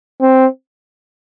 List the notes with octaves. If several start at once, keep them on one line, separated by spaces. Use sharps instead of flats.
C4